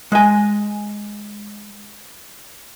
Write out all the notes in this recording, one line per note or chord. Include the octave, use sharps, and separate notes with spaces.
G#3 G#5